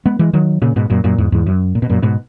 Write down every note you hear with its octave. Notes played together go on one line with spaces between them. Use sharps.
G#3 B3
E3 G#3
D#3 F#3
A#2 C#3
G#2 B2
F#2 A#2
F#2 A#2
E2 G#2
E2 G#2
F#2
A#2
B2
F#2 A#2
G#2 B2